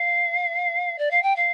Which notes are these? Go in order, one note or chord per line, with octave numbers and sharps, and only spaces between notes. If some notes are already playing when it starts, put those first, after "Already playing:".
Already playing: F5
D5
F5
G5
F5